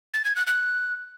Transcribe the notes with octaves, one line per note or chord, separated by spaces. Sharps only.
A6
G#6
F#6
F#6